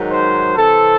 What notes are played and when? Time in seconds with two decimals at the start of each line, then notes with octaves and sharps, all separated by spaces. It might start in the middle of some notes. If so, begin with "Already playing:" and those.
Already playing: G#2 D#3 F#3
0.09 C5
0.56 C3 E3 C4 A4